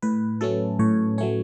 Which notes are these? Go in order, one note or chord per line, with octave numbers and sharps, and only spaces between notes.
A2 B4
F#3 A3 C#4 A4
A2 C#5
F#3 A3 C#4 C#5